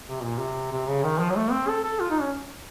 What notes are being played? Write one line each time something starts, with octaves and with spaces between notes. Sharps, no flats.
C3
A#2
C3
C3
C#3
D#3
F3
F#3
A3
C4
A4
A4
F4
D#4
C#4